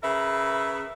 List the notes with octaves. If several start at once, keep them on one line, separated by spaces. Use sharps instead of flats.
C#3 A#4 B4 E5